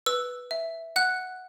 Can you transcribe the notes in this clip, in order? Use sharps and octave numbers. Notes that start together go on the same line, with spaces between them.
B4 E6
E5
F#5 F#6